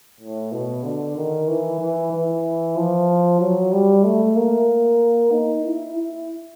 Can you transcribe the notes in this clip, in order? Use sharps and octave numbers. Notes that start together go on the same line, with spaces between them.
A2
B2
D3
D#3
E3
E3
E3
F3
F#3
G3
A3
A#3
D#4
E4
E4